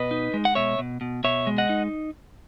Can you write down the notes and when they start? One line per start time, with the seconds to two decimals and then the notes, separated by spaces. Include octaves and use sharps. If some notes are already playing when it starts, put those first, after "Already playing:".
Already playing: B2 B4 D#5
0.11 D#4
0.34 G#3
0.45 F#5
0.55 B2 C#5 E5
0.79 B2
1.01 B2
1.24 B2 C#5 E5
1.47 G#3
1.58 D#5 F#5
1.69 D#4